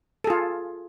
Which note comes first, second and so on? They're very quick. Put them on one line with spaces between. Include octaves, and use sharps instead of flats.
A4 G#4 F4